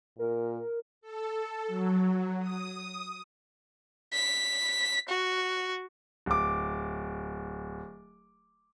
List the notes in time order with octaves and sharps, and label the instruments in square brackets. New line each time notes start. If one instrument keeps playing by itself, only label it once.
[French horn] A#2 [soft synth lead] A#4
[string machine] A4
F#3
D#6
[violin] B6
F#4
[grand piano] D1 D6